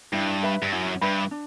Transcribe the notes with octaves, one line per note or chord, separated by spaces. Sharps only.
G2 E4
B4 E5 B5
G2
F#2 E4
G2 B4 E5 B5
D4